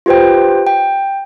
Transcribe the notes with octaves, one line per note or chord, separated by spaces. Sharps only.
F4 G4 B4 C5 G5
G5